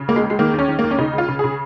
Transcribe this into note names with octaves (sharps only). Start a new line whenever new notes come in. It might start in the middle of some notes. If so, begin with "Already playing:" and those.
Already playing: C#3
C#2 A#3
G#3
C#2
G#3
D#3 A#3
D#2
C#4
D#3
A#3
D#2
C#4
C#3 D#4
C#2
F4
C#3
C#3 G#4